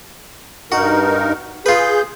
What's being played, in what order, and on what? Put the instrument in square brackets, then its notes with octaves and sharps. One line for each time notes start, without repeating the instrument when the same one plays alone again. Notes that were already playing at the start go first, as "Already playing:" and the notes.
[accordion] G2 D#4 A#4 [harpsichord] F#4
[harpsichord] F4 B4 [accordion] G#4 G6